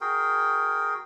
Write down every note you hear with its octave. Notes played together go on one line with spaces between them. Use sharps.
F#4 G#4 A#4 G5